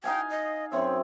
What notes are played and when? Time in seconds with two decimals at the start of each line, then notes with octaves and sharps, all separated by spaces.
0.04 D#4 F5 G5 G#5
0.30 D#5
0.72 F#2 C4 C#5 E5